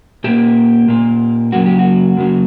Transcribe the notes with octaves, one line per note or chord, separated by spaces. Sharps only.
A#2 A#3 G4
A#2 A#3
F#2 C#3 F#3 A#3 F#4
G4
F#4
F#2 C#3 F#3 A#3